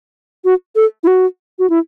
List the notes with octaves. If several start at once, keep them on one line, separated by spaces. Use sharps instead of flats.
F#4
A4
E4
F#4
F#4
E4